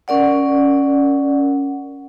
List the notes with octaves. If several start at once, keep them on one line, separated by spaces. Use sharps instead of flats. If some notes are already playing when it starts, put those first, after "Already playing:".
C#4 A#4 D5 F#5